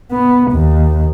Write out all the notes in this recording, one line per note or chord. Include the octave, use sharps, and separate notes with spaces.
B3
D#2